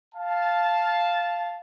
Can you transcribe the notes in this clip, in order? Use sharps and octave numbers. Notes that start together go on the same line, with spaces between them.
F5 A5